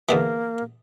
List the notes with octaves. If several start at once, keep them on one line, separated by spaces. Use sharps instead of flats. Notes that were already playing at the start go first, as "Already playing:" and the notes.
E2 D3 E3 A#3